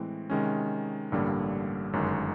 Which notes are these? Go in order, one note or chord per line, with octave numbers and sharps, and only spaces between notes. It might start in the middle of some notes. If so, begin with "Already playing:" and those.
Already playing: A2 E3 G#3 C4
C3 D#3 G#3 C#4
A1 G2 D3 G3 A#3
G1 F#2 D#3 G#3